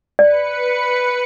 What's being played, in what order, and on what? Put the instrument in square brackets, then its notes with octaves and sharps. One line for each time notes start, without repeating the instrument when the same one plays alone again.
[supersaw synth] B4 C#7 [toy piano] D5